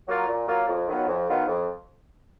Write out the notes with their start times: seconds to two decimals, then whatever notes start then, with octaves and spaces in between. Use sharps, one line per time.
0.08 F#3 A#3 F4 A#4
0.27 A#2
0.47 F#3 A#3 F4 A#4
0.67 F2
0.88 D#3 F#3 B3 F4
1.07 F2
1.28 D#3 F#3 B3 F4
1.47 F2